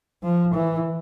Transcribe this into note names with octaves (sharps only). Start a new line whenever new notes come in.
F3
E3